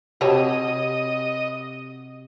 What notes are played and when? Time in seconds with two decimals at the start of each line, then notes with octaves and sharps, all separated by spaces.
0.21 C3 F#4 G4 C#5 D#5 A5